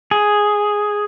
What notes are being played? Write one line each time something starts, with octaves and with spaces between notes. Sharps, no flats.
G#4